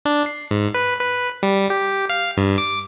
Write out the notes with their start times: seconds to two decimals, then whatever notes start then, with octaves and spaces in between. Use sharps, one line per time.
0.05 D4
0.26 C7
0.51 G#2
0.74 B4
1.01 B4
1.43 G3
1.70 G4
2.10 F5
2.37 G2
2.58 D6